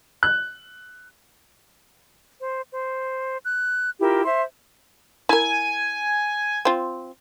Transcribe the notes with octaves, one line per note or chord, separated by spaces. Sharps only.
F#6
C5
C5
F#6
E4 F4 G4 A#4
C5 E5 C6
E4 A#4 G#5
C4 F4